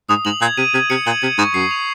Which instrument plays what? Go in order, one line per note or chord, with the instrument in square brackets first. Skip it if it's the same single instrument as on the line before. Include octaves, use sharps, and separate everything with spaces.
[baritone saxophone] G#2 [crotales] D#6
[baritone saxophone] G#2 [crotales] F#7
[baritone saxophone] A#2 [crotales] G#6
[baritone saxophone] C3 [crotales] D#7
[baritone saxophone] C3 [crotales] G#6
[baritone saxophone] C3 [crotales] C#7
[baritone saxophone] A#2 [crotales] F#7
[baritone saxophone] C3 [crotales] G#6
[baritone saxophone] G#2 [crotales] C#6
[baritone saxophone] F#2 [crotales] C7
[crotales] F7